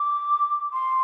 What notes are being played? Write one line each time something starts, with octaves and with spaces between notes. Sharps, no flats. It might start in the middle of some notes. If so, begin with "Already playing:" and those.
Already playing: D6
C6